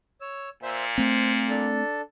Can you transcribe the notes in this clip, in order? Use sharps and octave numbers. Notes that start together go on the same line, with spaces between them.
C#5 E6
A#2 C5 E5 E6
A3 C4 C5
D4 A4